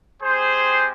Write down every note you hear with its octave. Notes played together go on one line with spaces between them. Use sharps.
G#3 C4 G4 G#4 C5